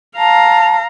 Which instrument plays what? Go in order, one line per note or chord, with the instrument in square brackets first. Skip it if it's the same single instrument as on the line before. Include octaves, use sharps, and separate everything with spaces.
[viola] F5 A#5 [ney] A5